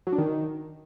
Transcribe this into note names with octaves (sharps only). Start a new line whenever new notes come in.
F#3
D4
D#3